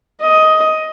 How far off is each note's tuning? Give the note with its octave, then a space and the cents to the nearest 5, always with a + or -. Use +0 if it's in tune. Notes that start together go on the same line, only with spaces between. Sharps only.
D#5 +10